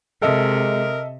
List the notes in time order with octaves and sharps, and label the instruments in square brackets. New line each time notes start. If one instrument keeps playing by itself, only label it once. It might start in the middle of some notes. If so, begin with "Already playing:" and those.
[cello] C3 [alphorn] G#3 [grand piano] A4 D#5 E5 [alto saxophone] A#4